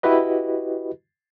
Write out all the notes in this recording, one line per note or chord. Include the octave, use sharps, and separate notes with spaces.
E4 F#4 G4 B4 D#5